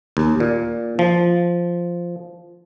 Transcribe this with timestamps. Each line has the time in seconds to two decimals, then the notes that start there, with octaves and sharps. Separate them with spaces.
0.17 D#2
0.40 A#2
0.99 F3